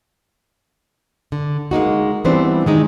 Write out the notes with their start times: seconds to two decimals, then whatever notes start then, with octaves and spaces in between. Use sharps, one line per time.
1.32 D3
1.71 G#3 A#3 D#4 F#4
2.25 E3 G3 B3 C4 D4 C5
2.66 D#3 G#3 D#4